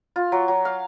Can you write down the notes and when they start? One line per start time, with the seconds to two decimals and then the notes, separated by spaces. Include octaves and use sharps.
0.16 F4
0.32 F#3
0.48 F#3
0.65 F5